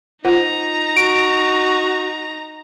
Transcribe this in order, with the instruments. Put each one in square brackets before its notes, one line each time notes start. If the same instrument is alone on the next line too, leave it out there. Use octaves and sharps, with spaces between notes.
[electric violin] D#4 A#5 [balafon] F4 C5 F#5
[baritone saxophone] F#4 [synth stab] D7